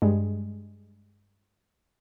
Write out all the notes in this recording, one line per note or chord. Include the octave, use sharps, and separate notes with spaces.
G2 G#3